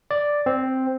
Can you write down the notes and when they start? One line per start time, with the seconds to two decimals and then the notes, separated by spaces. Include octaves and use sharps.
0.11 D5
0.46 C4